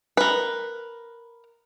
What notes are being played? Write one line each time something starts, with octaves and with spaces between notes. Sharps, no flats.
A#4 B4